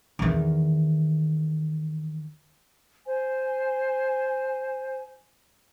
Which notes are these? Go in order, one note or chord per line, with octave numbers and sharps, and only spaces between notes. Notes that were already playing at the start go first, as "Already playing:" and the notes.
E2 D#3
C5 G#5